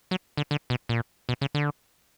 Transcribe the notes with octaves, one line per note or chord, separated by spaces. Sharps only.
F#3
D3
D3
B2
A#2
B2
C#3
D3